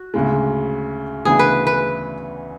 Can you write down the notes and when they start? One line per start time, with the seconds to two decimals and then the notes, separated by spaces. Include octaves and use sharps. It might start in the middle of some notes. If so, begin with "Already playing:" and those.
Already playing: F#4
0.14 D2 C#3 G#3
1.25 D2 C#3 E3 B3 D4 G#4
1.39 B4
1.67 B4